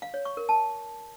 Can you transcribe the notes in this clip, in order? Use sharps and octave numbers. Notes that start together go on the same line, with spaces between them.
F5
C#5
C#6
A#4
A5